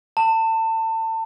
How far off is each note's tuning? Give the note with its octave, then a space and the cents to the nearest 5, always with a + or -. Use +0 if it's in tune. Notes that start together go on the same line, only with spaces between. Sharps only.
A5 +30